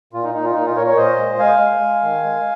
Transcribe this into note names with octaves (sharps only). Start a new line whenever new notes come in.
A#2 F4
D#4
A#2 D#4
F4
A#2 D#4
F4
A#2 A#4 C#5
A#4 C#5
A#2 C5 D#5
G#3
G#3 F5 G#5
G#3
G#3
D#3
G#3